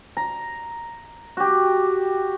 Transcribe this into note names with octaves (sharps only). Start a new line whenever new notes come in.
A#5
F#4 G4